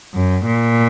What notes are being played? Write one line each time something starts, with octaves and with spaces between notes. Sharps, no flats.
F#2
A#2